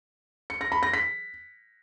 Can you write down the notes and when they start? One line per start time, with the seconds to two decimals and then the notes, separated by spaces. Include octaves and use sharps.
0.50 C#7
0.61 A#6
0.72 B5
0.83 A#6
0.93 B6